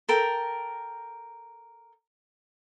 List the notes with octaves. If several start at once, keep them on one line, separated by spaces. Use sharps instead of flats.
A4 A#4 G5